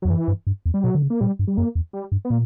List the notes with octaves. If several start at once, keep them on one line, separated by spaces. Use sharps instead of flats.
F#3
E2
F#2 E3
G2
G2
E2
G3
B2 F#3
D3
C#3
A#3
A#2 G3
G2
G3
F#2 A#3
E2
G3
G2
B3
A#2 A#3